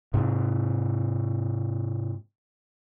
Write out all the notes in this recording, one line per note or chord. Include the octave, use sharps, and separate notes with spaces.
G#2 C3